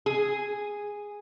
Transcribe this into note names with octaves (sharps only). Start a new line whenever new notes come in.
G#4